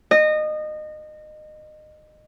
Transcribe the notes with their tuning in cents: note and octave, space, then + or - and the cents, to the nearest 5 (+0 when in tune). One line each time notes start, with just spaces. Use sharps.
D#5 -25